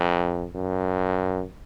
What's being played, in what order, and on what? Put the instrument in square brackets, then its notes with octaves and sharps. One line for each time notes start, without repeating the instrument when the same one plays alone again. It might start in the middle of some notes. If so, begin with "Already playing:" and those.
Already playing: [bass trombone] F2
F#2